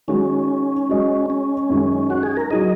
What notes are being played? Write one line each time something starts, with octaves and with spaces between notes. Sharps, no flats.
D#3 G#3 C#4 F#4
G#3 F#4 D#5
C#4
F#2 D#3 G#3
F#4
G#4
A#4
F#3 D#4 G#4 D#5